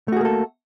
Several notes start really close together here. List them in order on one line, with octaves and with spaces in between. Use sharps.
A3 F#4 G#4 A#3 A4